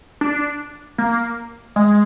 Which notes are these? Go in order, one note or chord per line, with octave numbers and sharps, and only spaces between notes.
D4
A#3
G#3